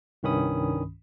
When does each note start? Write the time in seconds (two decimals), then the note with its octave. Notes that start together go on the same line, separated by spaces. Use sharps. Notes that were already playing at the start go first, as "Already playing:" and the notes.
0.23 C2 G2 D#3 C#4 B5 D#6